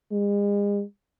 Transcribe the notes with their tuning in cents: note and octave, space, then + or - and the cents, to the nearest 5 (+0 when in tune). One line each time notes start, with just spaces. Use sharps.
G#3 -40